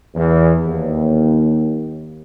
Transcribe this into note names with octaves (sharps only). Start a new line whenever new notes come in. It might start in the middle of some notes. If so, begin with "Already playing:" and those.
E2
D#2